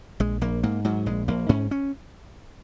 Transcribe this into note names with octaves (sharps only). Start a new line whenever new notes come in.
A#1 G#3
A#1 A#3
G#2 A#3
G#2 F#3
A#1 G#3
A#1 A#3
G#2 C#4
C#4